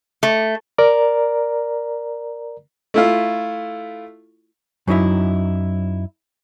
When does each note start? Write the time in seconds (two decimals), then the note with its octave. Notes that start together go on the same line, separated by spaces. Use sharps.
0.23 A3
0.78 A#4 D5 A#5
2.94 A3 E4 F4
4.88 F#2 F#3 D#4 E4 E5